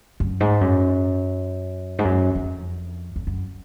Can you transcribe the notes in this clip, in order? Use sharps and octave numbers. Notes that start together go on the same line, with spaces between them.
F#2
G#2
F#2
G#2
F#2
F2
F2
F#2